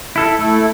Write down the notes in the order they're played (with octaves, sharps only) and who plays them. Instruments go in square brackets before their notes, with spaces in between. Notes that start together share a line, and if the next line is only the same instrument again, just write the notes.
[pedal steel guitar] E4 A4
[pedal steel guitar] A3 [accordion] E4 A4